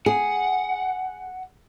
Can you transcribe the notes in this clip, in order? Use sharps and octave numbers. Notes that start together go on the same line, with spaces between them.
G#4 F#5